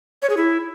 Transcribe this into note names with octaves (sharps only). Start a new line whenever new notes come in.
C#5
G#4
E4